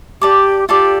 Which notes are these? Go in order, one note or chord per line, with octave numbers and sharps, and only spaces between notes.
G4 D5 A5 D6
F4 G4 A4 D5